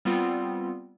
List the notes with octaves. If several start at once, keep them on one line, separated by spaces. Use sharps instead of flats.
G3 B3 C4 F4